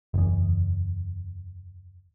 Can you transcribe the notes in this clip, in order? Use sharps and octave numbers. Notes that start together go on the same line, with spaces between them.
F#1 E2